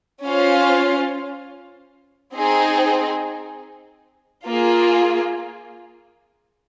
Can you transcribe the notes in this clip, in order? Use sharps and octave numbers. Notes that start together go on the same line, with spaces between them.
C#4 F4 C5 F5
C4 D#4 G#4
A#3 F4 G#4